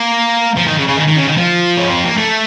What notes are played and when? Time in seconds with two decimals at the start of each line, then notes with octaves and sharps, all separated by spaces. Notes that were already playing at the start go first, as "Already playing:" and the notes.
Already playing: A#3
0.57 F3
0.68 D#3
0.78 C#3
0.88 C#3
0.97 D#3
1.08 D#3
1.17 C#3
1.27 D#3
1.37 F3
1.77 C#4
1.90 C4
2.04 A#3
2.17 A3